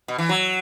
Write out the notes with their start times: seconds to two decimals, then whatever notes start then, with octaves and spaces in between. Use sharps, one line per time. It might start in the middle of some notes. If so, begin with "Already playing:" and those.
0.08 B2
0.18 E3
0.29 F#3